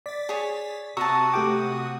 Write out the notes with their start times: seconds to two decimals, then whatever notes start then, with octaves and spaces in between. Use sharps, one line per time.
0.06 D5 A6 B6
0.29 G#4 C#5
0.97 C3 F#4 A5 A#5 C#6 D#6 E6
1.33 A3 G4 G5 D6